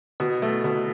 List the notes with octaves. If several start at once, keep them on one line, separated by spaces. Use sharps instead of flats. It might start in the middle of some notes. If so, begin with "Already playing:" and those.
B2
A3
B2